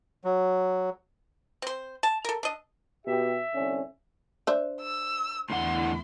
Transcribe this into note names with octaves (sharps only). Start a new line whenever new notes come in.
F#3
C4 C5
A5
A4 A#4
D4 D#5
B2 G4 E5
C2 D3 C#4
D4 C5 E5
E6
E2 A2 D3 E4 F#5 C6